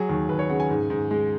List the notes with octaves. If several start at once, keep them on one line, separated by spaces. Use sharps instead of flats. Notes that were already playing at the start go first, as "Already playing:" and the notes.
Already playing: F#3 G#4
D#2
D#2 B4
C#5
C#3 F#5
G#5
G#2
G#2
G#3